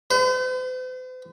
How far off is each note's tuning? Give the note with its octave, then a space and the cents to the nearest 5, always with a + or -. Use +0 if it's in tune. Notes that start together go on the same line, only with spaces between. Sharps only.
C5 -45